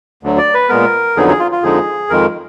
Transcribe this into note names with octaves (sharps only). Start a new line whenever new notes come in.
D2 D3 F#3
D5
B4
A#2 G#3 B3 A#4
F2 D3 F#3 B3 D#4 G#4
G#4
F4
F4
F2 D3 F3 G#3 D#4 G#4
F2 D#3 G#3 A#4